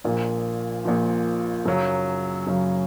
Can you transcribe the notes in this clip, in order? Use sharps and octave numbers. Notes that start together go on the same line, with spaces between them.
A#1 A#2 F3
A#1 A#2 F3
F#2 C#3 F#3
F#2 C#3 F#3